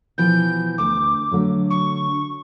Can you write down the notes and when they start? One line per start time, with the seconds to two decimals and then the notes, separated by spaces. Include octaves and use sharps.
0.18 B2 E3 F3 G6
0.78 D2 D6
1.31 D3 F#3 A3
1.70 C#6